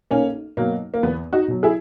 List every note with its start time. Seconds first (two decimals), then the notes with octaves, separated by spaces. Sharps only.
0.11 B1 A#3 C#4
0.57 B2 F#3 A#3
0.94 A#3
1.03 E2 B3
1.33 D#4 F#4
1.48 B2 F#3
1.63 E4 G#4